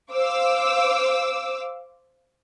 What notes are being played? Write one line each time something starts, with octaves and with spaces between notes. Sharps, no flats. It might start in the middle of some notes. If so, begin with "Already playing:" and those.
C5 F5 D6 E6